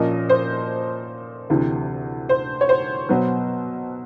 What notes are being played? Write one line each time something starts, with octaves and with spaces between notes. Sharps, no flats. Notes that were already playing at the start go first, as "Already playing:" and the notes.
Already playing: A#2 F3 A#3 C#4 D#5
C5
D2 C3 E3
C5
C#5
C5
B2 F#3 B3